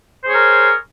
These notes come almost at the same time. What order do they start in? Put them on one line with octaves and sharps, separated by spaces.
C5 G#4 C#5 A#4